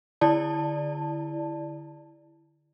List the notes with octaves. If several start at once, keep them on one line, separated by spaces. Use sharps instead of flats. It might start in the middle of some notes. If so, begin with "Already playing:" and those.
D3 E4 D5 A5